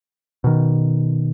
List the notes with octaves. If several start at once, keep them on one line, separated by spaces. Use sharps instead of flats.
B2 D#3